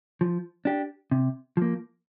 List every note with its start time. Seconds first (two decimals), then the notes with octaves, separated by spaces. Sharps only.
0.21 F3
0.65 D4 G4
1.11 C3
1.57 F3 A#3